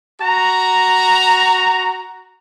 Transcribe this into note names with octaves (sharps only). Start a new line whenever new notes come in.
F#4 A#5